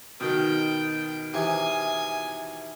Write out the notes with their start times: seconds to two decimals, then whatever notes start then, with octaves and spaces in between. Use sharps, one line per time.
0.21 B2 D#3 G5
1.34 C3 E3 G#5 D#6